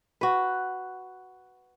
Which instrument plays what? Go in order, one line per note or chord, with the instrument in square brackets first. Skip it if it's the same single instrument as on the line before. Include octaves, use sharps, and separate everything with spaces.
[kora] F#4 B4